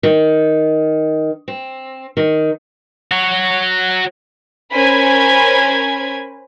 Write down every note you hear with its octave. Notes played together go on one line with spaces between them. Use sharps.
D#3
C4
D#3
F#4 C#5
C#4 A#4 C5 G#5 B5 G#6